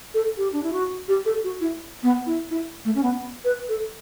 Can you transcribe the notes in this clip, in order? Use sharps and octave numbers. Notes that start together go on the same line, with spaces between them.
A4
G4
D4
E4
F#4
G4
A4
F#4
E4
B3
E4
E4
A3
C#4
B3
B4
A4